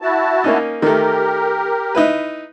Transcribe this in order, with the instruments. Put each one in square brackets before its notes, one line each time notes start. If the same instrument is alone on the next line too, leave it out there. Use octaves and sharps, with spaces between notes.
[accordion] E4 F#4 A5
[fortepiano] A#3 C#4 D#4
[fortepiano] D#3 A3 [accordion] G4 A#4
[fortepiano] D#4 E4 B4